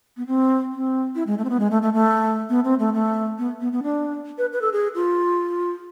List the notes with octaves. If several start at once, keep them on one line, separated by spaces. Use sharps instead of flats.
B3
C4
C4
E4
G#3
A3
C4
B3
G#3
A3
A3
A3
B3
C4
A3
A3
B3
B3
B3
D4
B4
B4
A4
G#4
F4